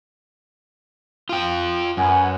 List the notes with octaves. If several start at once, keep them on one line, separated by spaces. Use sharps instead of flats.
F4 G5
F#2 B4 F#5 G#5